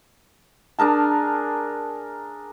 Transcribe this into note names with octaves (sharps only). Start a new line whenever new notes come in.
D4 G#4 A#4 A5